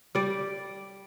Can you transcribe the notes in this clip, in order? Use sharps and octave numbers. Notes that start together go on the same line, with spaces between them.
G3 D5